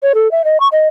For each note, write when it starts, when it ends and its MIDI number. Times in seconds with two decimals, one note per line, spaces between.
0.03 0.13 73
0.15 0.30 69
0.31 0.42 76
0.45 0.60 75
0.60 0.68 85
0.72 0.87 75